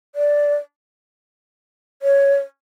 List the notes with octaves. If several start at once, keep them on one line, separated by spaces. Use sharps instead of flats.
D5
C#5